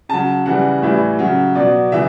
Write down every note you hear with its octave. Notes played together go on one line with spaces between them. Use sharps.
C#3 F#3 A5
C#3 E3 G3 F#5
A2 E3 G3 E5
C#3 F#3
B2 F#3 D5
C#3 E3 E5